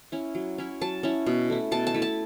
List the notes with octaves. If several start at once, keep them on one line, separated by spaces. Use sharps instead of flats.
C#4 E4
F#3
C#4 E4
F#3 A5
C#4 E4
B2
A3 E4
B2 A5
A5
A3 E4
A5